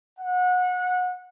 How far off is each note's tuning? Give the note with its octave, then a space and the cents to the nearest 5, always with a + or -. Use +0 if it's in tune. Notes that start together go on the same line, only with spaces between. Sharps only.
F#5 -25